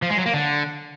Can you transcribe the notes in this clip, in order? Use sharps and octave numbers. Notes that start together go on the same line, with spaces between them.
F3
G#3
F#3
A#3
D3